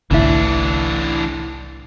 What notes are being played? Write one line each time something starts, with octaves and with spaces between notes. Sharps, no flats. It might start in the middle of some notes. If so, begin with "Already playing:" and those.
G1 C2 A2 D3 E3 D4 E4